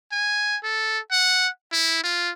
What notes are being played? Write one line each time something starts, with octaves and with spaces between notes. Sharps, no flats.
G#5
A4
F#5
E4
F4